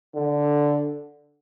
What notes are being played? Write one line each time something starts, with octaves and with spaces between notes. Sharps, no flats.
D3